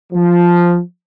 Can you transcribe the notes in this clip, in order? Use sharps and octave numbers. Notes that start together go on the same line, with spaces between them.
F3